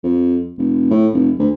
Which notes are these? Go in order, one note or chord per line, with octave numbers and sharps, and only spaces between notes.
F2
F1
A2
F1
D2